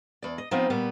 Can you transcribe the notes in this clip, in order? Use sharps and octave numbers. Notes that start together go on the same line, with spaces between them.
E2 D5
D#5
F3 B3 C4 D#4 F4
A#2 G3 B3